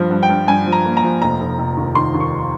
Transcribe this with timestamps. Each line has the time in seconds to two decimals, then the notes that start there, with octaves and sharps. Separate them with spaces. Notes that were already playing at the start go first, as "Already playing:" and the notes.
Already playing: G2 F3
0.11 G2
0.23 G5
0.29 G2
0.48 G2 G#5
0.66 F3
0.72 A#5
0.85 A#3
0.97 A#5
1.03 F3
1.21 F1 A#5
1.40 F1
1.59 F1
1.77 D#2
1.95 D#3 C6
2.14 D#2
2.20 C#6